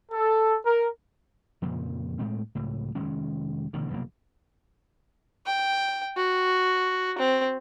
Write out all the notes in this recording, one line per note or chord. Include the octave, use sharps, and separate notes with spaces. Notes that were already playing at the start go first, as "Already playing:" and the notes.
A4
A#4
F2 A#2 C#3 F3
A2 G#3 A3 C4
C#2 A2
F1 D#3 G#3 C#4
A1 B2 D3 D#3
F1 B1 F#2 A#3
G5
F#4
C4